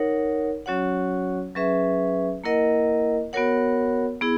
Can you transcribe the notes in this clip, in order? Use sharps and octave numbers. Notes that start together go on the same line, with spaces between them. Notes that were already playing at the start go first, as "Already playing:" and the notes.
Already playing: D#4 A#4 C#5 F#5
F#3 C#4 F#4 C#5 F#5
F#3 C#4 G#4 B4 E5
A#3 E4 A#4 D#5 F#5
B3 F#4 A#4 C#5 F#5
B3 E4 G#4